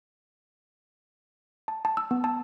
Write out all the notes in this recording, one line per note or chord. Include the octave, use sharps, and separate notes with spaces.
A5
A5
E6
B3
A5